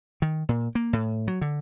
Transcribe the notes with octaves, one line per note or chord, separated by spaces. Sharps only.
D#3
A#2
A#3
A2
F#3
D3